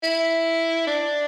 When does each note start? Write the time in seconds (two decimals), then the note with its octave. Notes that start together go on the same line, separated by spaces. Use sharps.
0.03 E4
0.87 D4